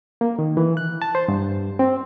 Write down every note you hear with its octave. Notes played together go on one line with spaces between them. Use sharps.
A#3
D#3
E3
F#6
A5
C5
G2
C4